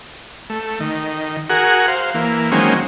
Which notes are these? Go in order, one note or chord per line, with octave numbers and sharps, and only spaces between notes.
A3
D#3
F#4 G#4 A#4 F#5
C5 F5
E3 A#3
D#3 F#3 G#3 A#3 C4 C#4